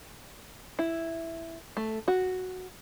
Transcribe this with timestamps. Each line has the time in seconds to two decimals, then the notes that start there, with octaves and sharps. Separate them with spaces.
0.79 E4
1.77 A3
2.08 F#4